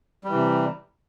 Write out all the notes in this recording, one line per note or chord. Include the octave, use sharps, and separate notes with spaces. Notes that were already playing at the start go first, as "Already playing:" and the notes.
C3 E3 G3